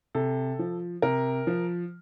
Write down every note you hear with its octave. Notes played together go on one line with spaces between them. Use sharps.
C3 A4
F3
C3 A#4
F3